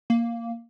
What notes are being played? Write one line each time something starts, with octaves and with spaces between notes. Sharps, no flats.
A#3